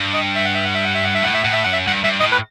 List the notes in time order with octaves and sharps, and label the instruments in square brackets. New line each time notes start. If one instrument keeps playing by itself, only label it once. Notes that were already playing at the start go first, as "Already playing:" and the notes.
Already playing: [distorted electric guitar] G2
[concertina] D#5
E5
F#5
E5
F#5
E5
F#5
E5
F#5
E5
[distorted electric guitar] A2 [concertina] F#5
[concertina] E5
[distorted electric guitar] A2 [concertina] F#5
[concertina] E5
[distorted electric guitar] F#2 [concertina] F#5
[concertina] E5
[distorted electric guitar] G2 [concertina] F#5
[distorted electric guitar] G2 [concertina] E5
[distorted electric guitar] A2 [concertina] D#5
[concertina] B4